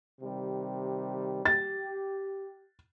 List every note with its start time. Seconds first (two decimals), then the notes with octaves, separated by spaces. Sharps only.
0.21 C3 D#3 G3
1.45 G4 A6